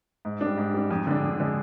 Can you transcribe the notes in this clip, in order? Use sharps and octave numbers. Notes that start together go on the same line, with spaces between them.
G#2
D4
G3
G#2
G3 D4
F2
D3 G#3 D4
F2
D3 G#3 D4